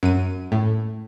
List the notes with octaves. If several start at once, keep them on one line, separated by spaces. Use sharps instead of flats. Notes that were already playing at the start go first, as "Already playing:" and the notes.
F#2 D#7
A2